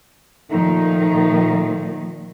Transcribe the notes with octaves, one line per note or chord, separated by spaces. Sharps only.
A#2 D#3 F3 A3 D#4